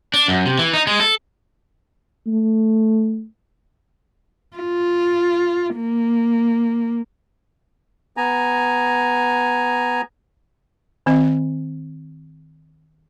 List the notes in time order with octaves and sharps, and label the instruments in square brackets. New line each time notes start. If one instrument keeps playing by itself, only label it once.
[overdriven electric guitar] D4
F#2
C3
E3
D#4
G#3
A4
[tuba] A3
[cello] F4
A#3
[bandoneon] B3 G#5 A#5
[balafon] D#3 C4 D#5